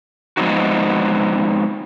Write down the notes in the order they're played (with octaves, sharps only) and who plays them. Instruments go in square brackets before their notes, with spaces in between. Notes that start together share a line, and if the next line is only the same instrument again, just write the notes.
[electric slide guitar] F3 G#3 B3 C4 D#4 F#4